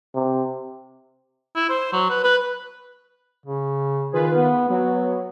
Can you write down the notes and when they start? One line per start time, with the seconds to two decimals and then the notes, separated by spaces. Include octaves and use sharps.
0.14 C3
1.56 E4
1.69 C5
1.93 F#3
2.10 B4
2.24 B4
3.46 C#3
4.13 D#3 F4 G#4 B4
4.33 B3
4.69 F#3 B3